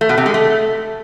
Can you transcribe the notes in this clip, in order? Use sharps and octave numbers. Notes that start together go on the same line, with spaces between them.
A3
B2
C3
G#3
A3